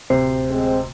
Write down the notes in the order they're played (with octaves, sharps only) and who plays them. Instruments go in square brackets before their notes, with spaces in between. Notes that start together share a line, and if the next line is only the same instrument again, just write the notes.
[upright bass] D1 D2 [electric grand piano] C3 [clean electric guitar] C5
[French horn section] G#3 C4